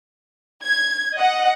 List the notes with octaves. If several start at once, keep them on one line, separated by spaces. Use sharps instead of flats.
G#6
D#5 F#5